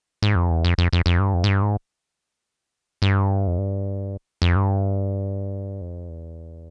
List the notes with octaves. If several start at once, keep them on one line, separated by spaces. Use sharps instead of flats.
G#2
F2
E2
F2
F2
F2
F2
G2
F2
G#2
G2
G#2
G2
F2
G2
F2
G2
F2
E2